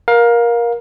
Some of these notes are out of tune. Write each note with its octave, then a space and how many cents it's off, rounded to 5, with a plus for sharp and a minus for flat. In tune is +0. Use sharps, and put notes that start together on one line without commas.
A#4 +20 F5 +20